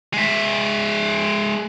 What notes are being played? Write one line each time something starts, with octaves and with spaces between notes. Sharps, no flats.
G#3 E5